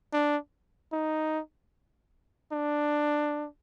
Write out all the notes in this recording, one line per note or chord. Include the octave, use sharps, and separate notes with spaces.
D4
D#4
D4